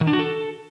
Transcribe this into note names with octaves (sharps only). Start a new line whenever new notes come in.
D#3
D4
F#4
A4